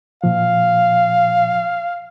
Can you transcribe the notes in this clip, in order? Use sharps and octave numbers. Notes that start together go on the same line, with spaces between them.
A#2 F3 F5